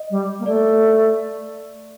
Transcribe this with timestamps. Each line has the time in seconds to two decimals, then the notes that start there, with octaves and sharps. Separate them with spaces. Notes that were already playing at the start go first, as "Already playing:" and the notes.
Already playing: D#5
0.10 G3
0.39 A#3
0.46 A3 D5